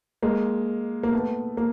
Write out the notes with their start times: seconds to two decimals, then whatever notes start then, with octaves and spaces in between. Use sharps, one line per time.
0.23 G#3 A#3
1.03 A#3
1.12 A3 B3
1.57 A#3